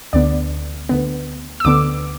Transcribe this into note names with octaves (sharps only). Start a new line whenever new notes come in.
D2 D3 B3 D5
D2 D3 B3
E6
D2 D3 B3 D6